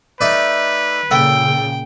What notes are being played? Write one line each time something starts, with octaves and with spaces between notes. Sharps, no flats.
A3 D#4 B4 D5
A#2 C#3 A4 G5